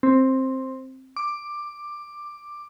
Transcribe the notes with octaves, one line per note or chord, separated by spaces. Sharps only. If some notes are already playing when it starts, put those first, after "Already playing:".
C4
D6